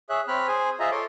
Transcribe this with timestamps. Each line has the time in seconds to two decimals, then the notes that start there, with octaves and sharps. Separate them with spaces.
0.10 G#4 C#5 E5 F#6
0.28 C4 C#5 B5 F6 F#6
0.48 G#4 C5 G#5
0.80 F4 G#4 C5 D#5 E5 A#5
0.91 A4 C#5 C6 D6